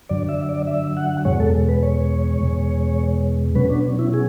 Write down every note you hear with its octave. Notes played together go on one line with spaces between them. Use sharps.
F#2 D3 F#3 D5
E5
D5
E5
F#5
E2 B2 G#3 C#5
A4
B4
C#5
E2 B2 G#3
B2 F#3 C#4 B4
D4
E4
G#4